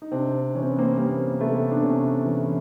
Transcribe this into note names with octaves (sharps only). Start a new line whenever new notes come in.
D#4
C3 C4 D4
E3 C#4
C4
B3
A#3 C4
G3 A#3 C4
C3 A3 B3
D4
C3 B3 C#4
E3